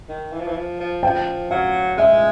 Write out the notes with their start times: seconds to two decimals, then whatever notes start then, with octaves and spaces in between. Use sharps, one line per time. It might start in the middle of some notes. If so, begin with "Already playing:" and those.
0.09 D#3
0.33 E3
0.40 F3
0.48 E3
0.56 F3
0.80 F3
1.03 F3 G5
1.51 F#3 F5
1.98 G#3 E5